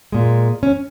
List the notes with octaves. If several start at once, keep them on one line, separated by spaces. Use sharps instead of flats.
A#2 G#3
C#4